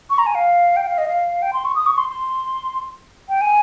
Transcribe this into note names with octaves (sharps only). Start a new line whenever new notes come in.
C#6
A#5
G#5
F5
G5
F5
D#5
F5
G5
C6
C#6
D#6
C#6
C6
C6
G5
G#5